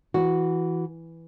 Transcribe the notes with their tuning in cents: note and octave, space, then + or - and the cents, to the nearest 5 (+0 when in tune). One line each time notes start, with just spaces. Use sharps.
E3 +0 F#4 +0